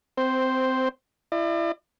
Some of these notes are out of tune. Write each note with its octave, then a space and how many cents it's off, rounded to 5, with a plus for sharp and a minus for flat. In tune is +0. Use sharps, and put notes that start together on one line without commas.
C4 -15 C5 +0
E4 +25 D5 +40